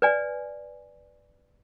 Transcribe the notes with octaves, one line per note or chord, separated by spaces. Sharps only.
B4 D5 G#5